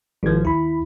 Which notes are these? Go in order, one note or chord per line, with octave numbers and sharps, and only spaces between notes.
G#1 F3 G3 G#6
D#2 E4 B5